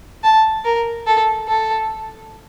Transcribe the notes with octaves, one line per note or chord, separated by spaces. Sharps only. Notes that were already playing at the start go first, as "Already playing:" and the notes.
A5
A#4
A4
A4